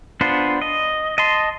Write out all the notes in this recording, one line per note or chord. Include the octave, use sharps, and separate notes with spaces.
B3 D4 F4 C5
D#5
D#5 A5 C6